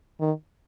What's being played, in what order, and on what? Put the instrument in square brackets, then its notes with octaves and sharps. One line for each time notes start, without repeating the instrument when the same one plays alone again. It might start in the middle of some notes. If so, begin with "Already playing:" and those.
[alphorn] D#3